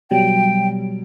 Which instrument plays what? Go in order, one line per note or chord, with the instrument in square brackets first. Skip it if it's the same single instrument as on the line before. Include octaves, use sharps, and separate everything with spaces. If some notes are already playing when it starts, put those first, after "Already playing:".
[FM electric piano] B2 F#3 G3 [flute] G5